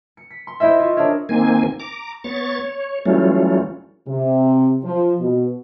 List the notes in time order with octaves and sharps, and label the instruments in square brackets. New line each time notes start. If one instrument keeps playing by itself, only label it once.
[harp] C#7
B6
C6
E4 C5 D#5 E5
F4 C#6
D4 G#4 A#4 C#5 E5
[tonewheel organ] D#3 A#3 C4 G#5
A#5 D6
B3 C#5 C#6 A6
C#5
E3 F#3 G3 A3 C#4 F4
[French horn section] C3
F3
B2